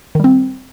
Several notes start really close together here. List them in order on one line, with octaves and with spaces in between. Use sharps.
D#3 G3 C4